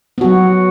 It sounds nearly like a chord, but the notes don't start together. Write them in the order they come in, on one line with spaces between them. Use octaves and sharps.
B3 F#4 F#3